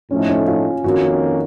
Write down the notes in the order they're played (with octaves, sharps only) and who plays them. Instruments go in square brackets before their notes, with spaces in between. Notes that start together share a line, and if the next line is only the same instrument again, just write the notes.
[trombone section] A2 F3 A3 D#4 [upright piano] C#4
[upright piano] C#4
F4
[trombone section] F2 D#3 A#3 C#4 [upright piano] F#4